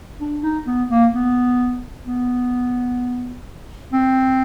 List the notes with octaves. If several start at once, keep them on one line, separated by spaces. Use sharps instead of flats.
D4
D#4
B3
A#3
B3
B3
C4